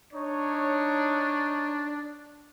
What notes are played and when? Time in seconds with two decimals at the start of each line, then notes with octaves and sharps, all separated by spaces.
0.13 D4 D#4 C#5